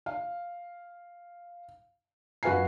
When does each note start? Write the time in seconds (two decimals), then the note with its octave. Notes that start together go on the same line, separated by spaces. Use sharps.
0.06 F5
2.43 F#2 F#4 B4 F5 G#5 C7